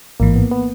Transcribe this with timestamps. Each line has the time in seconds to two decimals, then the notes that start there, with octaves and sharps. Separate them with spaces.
0.20 A1 G#2 E3 A#3
0.36 B3
0.51 B3